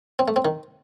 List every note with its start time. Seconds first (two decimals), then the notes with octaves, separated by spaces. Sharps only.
0.19 C4
0.28 A3
0.36 C4
0.45 D#3